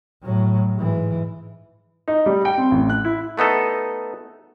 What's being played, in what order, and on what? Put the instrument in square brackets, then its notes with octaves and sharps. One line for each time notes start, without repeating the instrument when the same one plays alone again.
[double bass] A2 F#3
G#2 E3
[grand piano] D#4
G3
G5
C4
A1
F#6
E4
[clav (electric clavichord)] A3 B3 D#4 A4